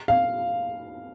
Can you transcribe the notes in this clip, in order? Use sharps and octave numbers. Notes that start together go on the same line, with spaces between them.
F5